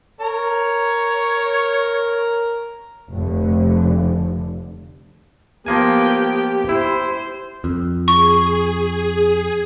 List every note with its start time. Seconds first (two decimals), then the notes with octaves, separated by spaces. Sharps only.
0.21 A#4 C#5 A#5
3.10 F1 D3
5.66 F3 A#3 B3 G4 G5 G#5
6.69 E4 C5
7.64 F2
8.08 G#4 C#6